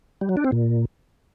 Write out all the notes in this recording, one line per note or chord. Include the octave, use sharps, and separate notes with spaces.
G3
F#3
D4
C4
A#2